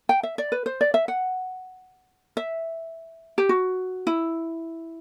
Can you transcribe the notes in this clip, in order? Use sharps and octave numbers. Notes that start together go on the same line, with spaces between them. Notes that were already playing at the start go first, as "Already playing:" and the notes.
G5
E5
D5
B4
C5
D5
E5
F#5
E5
G4
F#4
E4